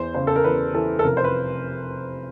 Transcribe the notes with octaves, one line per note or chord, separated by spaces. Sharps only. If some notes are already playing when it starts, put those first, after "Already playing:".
Already playing: E2 C5
C#3 C5
A4
A#4
E2 B4
E3 A4
A4
F1 A#4
C5
B4